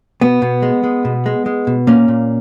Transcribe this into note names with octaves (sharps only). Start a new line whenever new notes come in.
B2 B3
B2
G#3
G#3
B2
G#3
G#3
B2
A#2 A#3 C#4
A#2